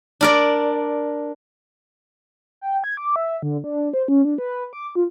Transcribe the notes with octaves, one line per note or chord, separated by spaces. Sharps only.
D4 A#4 D5
G5
G#6
D6
E5
D3
D4
C5
C#4
D4
B4
D6
F4